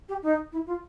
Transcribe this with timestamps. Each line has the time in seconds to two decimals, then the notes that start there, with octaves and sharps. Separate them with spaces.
0.08 G4
0.22 D#4
0.52 E4
0.66 F4